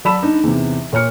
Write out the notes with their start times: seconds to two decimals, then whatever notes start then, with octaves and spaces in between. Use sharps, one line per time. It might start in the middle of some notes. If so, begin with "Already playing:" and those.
0.05 F#3 D5 A5 B5 E6 E7
0.22 D4 D#4
0.43 E2 C3
0.93 A#2 C#5 F6 C#7